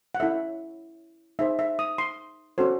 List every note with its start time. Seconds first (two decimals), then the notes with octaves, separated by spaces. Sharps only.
0.15 F#5
0.20 C#4 E4 A4 C#5 E5
1.39 D#4 G#4 C5 E5
1.59 E5
1.79 D#6
1.98 C6
2.58 C#4 F#4 A4 C5